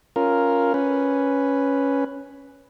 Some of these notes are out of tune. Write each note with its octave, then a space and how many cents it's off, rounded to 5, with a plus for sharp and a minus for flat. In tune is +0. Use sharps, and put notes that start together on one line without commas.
C#4 +0 F4 +0 A#4 +0
C#4 +0 B4 +0